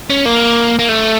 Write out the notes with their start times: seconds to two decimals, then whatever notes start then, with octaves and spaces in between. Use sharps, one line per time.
0.10 C#4
0.25 A#3
0.79 A#3
0.89 A3